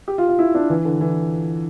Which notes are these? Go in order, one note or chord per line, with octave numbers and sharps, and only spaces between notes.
G4
F4
F4
E4
D4
E3
D3
E3